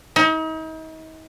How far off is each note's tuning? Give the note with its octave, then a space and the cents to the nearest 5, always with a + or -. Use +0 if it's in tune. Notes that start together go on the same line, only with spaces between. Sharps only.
D#4 +40